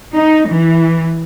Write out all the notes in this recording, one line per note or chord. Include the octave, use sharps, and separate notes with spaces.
D#4
E3